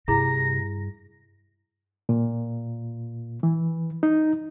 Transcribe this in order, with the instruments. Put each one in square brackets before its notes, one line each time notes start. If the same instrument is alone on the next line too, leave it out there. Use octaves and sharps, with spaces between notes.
[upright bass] G2 [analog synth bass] C3 [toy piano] E4 G#4 A#5 [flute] A#6
[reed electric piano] A#2
E3
D#4